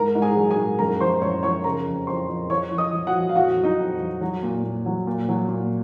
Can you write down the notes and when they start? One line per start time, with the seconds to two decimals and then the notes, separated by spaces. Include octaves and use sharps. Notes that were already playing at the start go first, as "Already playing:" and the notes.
Already playing: G#2 A#4 A#5
0.15 G#2
0.22 G#4 G#5
0.37 F#3
0.51 G#4 G#5
0.57 G#2
0.79 F#2 A#4 A#5
1.00 F3 C5 C6
1.21 F#2 C#5 C#6
1.43 F3 C#5 C#6
1.64 C#3 A#4 A#5
1.86 F2
2.07 F2 C5 C6
2.29 F2
2.50 F3 C#5 C#6
2.71 F3
2.78 D#5 D#6
2.93 F3
3.07 F#4 F#5
3.14 F3
3.29 F5
3.35 F2 F#4 F#5
3.57 F#3
3.64 D#4 D#5
3.79 F2
4.00 F#3
4.21 F#3
4.43 A#2
4.64 A#2
4.86 F#3
5.07 A#2
5.29 F#3
5.49 A#2